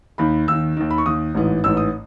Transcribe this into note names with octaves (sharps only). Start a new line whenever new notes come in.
D#2 D#3 B5
D#2 D#3 E6
D#2 D#3
B5
C#6
D#2 D#3 D#6
A1 G#2 E3
A1 G#2 E3 E6
D#6